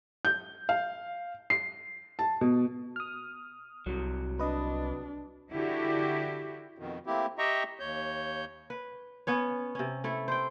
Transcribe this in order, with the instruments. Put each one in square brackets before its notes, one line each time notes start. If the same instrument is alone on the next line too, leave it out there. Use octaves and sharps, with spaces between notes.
[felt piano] G6
F5
C7
A5
B2
[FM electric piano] D#6 F6
[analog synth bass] C2 [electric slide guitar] C3 F#3
[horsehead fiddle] D4 [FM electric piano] B4 D#5
[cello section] D3 E4 F#4 G4
[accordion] F2 B2 D#3
A3 A#3 C4 E4 G4
G4 D#5 E5 G5 A#5 C#6
D#2 C#5 G6
[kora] B4
B3 C#4 C#5
C3 C#4
A3 E4 A4
C5 G5